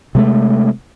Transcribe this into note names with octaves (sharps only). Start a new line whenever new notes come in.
C3 G#3 A3